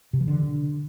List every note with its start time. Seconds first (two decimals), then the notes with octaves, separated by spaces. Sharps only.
0.13 C3
0.20 E3
0.28 D3